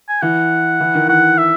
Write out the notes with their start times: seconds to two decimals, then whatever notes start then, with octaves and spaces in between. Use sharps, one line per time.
0.09 G#5
0.22 E3 F#5
0.80 E3
0.95 D#3
1.08 E3 F#5
1.38 E5